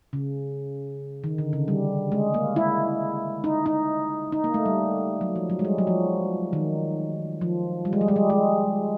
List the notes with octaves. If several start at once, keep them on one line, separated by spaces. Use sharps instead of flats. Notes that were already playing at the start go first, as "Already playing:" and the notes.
C#3
D#3
D3
C#3
G3
G#3
A#3
E4
D#4
D#4
D#4
A#3
A3
G3
F#3
F3
F#3
G#3
G3
F#3
F3
D#3
F3
G3
G#3
G3
G#3
G3
G#3